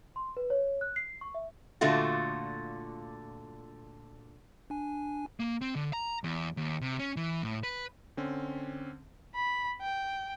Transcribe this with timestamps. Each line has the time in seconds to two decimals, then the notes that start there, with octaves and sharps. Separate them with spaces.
0.16 C6
0.37 B4
0.50 C#5
0.81 F#6
0.96 C7
1.21 C#6
1.35 E5
1.81 A#2 D3 A3 F4 F#4
4.70 D4 G#5
5.40 A#3
5.61 C4
5.75 D3
5.93 A#5
6.24 E2
6.57 D#2
6.81 C3
6.99 C#4
7.17 E3
7.43 A2
7.63 B4
8.17 D3 C4 C#4
9.35 B5
9.82 G5